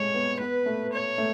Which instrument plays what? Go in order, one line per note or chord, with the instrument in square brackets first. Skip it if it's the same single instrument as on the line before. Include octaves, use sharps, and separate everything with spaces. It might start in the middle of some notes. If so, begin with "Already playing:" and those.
Already playing: [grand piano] G#3 A3 [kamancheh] C#5
[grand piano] B3
[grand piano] B3 [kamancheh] B4
[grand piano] A3
[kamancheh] C#5
[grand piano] A3